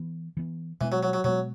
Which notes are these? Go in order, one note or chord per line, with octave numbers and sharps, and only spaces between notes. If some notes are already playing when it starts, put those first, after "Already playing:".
Already playing: E3 B3
E3 B3
B2 E3 G#3 B3
F#3
F#3
F#3
B2 F#3 G#3 B3